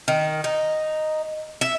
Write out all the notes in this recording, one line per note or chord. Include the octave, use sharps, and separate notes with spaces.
D#3
D#4
E5